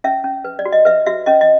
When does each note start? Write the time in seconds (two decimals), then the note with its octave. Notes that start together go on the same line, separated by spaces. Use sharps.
0.04 C#4 E5
0.24 C#4
0.45 B4
0.59 D5
0.65 F#4
0.72 D#5
0.85 B4 E5
1.06 F#4 E5
1.26 C#4 D#5
1.41 D#5